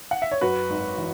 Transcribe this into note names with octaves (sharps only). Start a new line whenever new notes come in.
F#5
E5
C#5
F#2 F#4 B4
G#1
E3